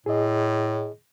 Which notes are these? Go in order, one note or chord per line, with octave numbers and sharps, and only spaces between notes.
A2 G#4 D#5